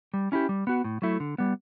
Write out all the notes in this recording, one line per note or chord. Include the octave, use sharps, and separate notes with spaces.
G3
C#4 E4 G4
G3
B3 F#4
A2
F#3 A3 E4
D3
G3 B3